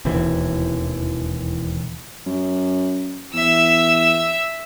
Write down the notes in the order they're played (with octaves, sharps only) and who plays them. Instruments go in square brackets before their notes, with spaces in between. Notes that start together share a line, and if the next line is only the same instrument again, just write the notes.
[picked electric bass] E1 D#2 C3 E3
[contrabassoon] F#2
[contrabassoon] E2 [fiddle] E5 E6